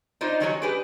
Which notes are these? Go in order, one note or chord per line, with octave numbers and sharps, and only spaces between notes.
D4 D#4 F4 C5 D#5
D#3 F#3 G3 C#4 F#4 C#5
D4 G4 G#4 B4